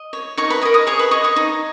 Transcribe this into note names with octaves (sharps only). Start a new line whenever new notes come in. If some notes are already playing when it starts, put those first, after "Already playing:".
Already playing: D#5
C#5
D#4 C#5 C#6
B4 B5
A#4 C#5 D#5 C#6
D#5 D#6
G#4 C#5 C#6
B4 B5
C#5 D#5 C#6
C#5 C#6
D#4